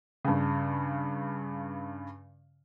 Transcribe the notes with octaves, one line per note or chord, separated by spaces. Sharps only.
G2 C#3